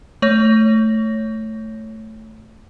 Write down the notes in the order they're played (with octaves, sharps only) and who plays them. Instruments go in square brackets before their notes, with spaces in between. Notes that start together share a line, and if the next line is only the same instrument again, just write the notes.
[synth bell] A3 C#5 A#6